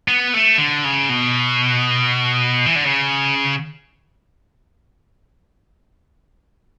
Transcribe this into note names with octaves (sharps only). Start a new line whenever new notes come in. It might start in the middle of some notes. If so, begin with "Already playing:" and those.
B3
A3
D3
C#3
B2
E3
D3
C#3